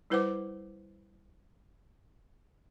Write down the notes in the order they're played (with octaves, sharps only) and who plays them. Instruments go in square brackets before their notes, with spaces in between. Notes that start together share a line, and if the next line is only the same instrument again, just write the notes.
[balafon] G3 E4 B4 C5 F#5 D6